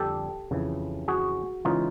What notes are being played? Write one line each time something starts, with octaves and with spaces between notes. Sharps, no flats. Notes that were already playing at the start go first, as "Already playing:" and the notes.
Already playing: F2 D3 G3 G4 A4
F2 C#3 E3
F#4 G#4
C#3 E3 G#3 C#4 D#4 F4